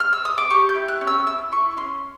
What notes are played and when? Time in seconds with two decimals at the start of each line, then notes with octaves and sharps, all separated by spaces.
0.00 F6
0.13 E6
0.25 D#6
0.38 D6
0.50 G4 C#6
0.69 G6
0.75 E4
0.88 F#6
1.01 C#4
1.07 E6
1.26 E4 E6
1.52 E4 C#6
1.77 C#4 C6